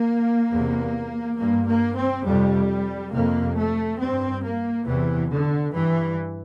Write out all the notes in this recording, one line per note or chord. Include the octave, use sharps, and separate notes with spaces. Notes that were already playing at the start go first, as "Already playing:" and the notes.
Already playing: A#3
E2 C3
G2 A#3
A#3
C4
F2 C3 G3
F2 C3 A#3
A3
G2 C4
A#3
E2 C3 E3
D3
G2 E3